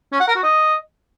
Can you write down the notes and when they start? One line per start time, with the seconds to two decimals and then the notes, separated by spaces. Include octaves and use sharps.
0.12 C#4
0.20 F#5
0.28 A#4
0.36 F#4
0.43 D#5